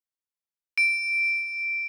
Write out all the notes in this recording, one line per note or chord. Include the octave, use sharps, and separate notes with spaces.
D7